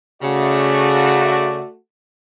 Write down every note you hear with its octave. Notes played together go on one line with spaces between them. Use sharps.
C#3 A3 F#4 D5